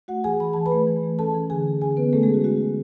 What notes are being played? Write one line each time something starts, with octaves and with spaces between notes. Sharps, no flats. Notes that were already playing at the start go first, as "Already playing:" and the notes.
A3 F#4 F#5
E3 G#4 G#5
E3 B5
E3 A5
B4 B5
A3
E3
A3
C#4 A4 A5
E3
D3 G#4 G#5
C#4
D3 G#4 G#5
D3 B3 B4
A3 C#4 A4
G#3 G#4
A3
F#4
A3 F#4
D3